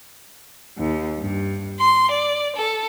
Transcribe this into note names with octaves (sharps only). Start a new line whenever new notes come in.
D#2
G2
C6
D5
A4